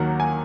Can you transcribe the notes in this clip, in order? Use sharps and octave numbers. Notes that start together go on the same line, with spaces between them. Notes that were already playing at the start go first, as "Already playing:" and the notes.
Already playing: D#2 D#3 F#3 A#3 F#5
G#5